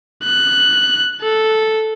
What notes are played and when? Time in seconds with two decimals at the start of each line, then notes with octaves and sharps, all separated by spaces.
0.24 F#6
1.22 A4